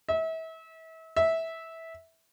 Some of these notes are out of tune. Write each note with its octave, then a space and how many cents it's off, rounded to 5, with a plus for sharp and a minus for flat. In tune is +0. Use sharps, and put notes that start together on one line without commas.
E5 -35
E5 -15